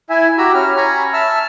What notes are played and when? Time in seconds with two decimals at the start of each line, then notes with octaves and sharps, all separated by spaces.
0.10 E4 E5 G#5
0.38 F#4 G4 A#5 B5 E6
0.54 C#4 F6
0.77 G#5 A#5 B5 C#6
1.13 E5 A5 E6 F6